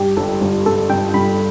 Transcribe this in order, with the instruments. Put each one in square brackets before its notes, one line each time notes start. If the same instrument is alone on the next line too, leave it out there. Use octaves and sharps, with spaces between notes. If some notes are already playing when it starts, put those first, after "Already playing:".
Already playing: [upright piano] G2 [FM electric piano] G4
[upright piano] G1 [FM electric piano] A4
[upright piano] G1
[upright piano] G2 [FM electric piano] A4
[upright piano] G2 [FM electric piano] G5
[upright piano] G2 [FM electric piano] B5